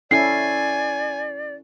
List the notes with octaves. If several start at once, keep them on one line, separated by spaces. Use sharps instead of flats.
C#4 E4 A4 D5 G#5 C7